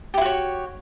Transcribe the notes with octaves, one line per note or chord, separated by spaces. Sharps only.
E4 F#4 G4 C#5